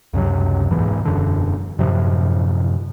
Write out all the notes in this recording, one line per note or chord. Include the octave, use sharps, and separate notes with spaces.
C#2 F#2 C3 F#3
E1 E2 G#2 E3
E1 F#2 D3
F#2 A2 C3 F3